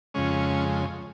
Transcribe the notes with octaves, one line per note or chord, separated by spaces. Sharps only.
F2 C#3 G#3 C#4